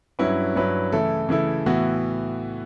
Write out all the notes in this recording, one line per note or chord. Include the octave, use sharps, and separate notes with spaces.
G2 F#3 C#4 E4 B4
G2 F#3 C#4 E4 B4
C#3 E3 A3 E4 A4
C#3 E3 A3 E4 A4
A2 E3 B3 F#4